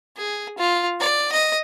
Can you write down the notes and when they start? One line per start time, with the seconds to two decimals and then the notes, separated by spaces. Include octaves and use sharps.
0.17 G#4
0.58 F4
1.00 D5
1.32 D#5